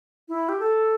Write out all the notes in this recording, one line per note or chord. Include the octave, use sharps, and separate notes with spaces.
E4
G4
A4